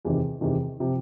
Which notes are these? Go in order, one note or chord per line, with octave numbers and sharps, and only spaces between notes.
E2 C3 D#3
E2 C3 D#3
C3 F3